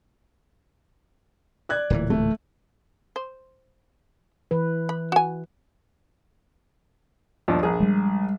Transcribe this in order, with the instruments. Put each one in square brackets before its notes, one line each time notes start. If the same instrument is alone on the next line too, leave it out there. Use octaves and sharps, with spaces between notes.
[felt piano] D5 F#6 G#6
[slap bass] D1 A#2 E3
[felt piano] A3
[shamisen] C5
[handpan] E3 B4
[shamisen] B5
F#4 G#5
[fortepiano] D#2 F3 D4
A#1 G#4
[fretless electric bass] G3 G#3